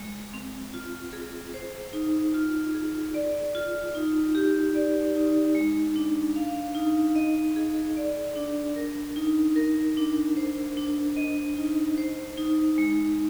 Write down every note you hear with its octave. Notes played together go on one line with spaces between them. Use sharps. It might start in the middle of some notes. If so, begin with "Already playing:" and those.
Already playing: G#3
C4
F4
G#4
C5
D#4
F4
G#4
D5
F4
D#4
G4
D5
D#4
G#3
D4
F5
D#4
D#5
G#4
D5
D4
A#4
D#4
A#4
D4
C5
D4
D#5
D#4
C5
D#4
G#3